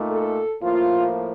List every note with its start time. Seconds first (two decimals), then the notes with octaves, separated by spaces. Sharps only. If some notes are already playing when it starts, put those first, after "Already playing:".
Already playing: A#2 A3 D#4
0.12 A4
0.62 A2 F3 A#3 F4